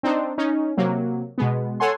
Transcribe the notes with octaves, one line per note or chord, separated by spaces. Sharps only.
C4 D4 D#4 C5
C#4 D#4
C3 F#3 A#3
B2 G#3 B3
A4 C#5 F#5 G#5 C6